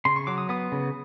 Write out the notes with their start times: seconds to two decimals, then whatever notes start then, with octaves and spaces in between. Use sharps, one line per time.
0.05 C#3 C6
0.16 C#6
0.27 F#3 D6
0.38 D#6
0.49 B3 D#6
0.72 C#3